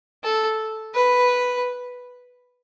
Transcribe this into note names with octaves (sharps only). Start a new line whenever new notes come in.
A4
B4